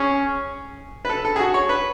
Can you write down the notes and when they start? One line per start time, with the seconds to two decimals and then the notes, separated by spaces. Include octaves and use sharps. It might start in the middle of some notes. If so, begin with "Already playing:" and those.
Already playing: C#4 G#4
1.05 B4
1.09 A4
1.25 A4
1.36 G#4
1.39 F#4
1.54 C#5
1.69 B4